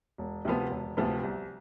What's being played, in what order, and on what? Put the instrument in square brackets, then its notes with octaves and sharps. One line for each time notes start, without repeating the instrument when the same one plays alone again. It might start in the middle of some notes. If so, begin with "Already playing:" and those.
[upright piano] E1
D2 C3 F3 B3
E1
D2 C3 F3 B3
C2